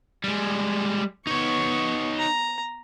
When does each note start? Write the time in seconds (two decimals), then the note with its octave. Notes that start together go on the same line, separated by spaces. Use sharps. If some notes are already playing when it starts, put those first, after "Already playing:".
0.24 G3 G#3
1.27 B3 D#4 C#5 C#6
2.19 A#5